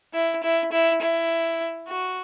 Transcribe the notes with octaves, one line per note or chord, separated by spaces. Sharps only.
E4
E4
E4
E4
F#4